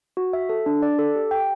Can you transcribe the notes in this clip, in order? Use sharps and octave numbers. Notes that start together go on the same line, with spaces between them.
F#4
E5
A4
D4
D5
A4
G4
G5